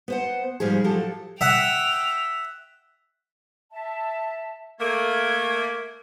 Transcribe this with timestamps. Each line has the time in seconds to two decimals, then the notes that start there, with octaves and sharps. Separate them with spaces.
0.08 B3 C5 F#5
0.60 G#2 F3 G3 D#4 G#4
0.84 F3 F#3 G4 A4
1.41 E5 F#5 G5 F7
3.71 E5 A5
4.80 A3 A#3 G#6